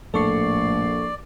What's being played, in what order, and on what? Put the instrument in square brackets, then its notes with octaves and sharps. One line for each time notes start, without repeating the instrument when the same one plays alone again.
[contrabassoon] A#1 [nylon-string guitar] A2 [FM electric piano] A4 C#6 C7 [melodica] D5